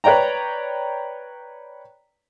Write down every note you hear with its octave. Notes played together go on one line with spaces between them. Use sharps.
B4 C#5 D5 G5 A#5